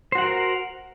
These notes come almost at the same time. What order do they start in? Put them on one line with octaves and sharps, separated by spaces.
C5 F#4 F#5 A#4